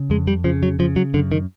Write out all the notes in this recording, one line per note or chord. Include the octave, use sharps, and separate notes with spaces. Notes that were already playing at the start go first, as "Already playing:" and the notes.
Already playing: C#3
F2 G#3
G3
C#3 F3
F#3
C#3 F3
F#3
F#2 D3
D#3